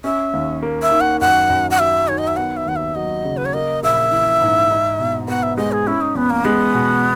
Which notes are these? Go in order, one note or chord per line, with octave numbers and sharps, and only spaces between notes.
C#4 E5
D#2
A#3
E5
D#3
F#5
F#2 F#5
F#2
F#5
F#3 E5
D#3 C#5
D#5
E5
B3 F#5
E5
D#2 F#5
E5
F#3 D#5
C#3
B4
C#5
A#3 D#5
A#1 E5
E3
G#2
D#4
B2
B3 F#5
E5
G#3 D#5
G#4
C#4 E4
D#4
E2 B3
A#3
G#3 B3
B2